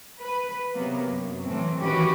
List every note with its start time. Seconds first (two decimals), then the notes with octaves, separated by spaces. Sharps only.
0.20 B4
0.73 C3 F#3 A#3 B3
1.09 F#2
1.44 A2 E3 F#3 C4
1.79 D#3 E3 C#4 F#4 G4 B4